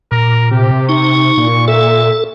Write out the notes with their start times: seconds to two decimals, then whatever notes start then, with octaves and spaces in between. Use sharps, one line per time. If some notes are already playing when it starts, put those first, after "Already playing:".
0.12 A#2 A#4
0.51 C3 G4
0.89 D#4 C#6
1.38 A#2
1.68 A4 E5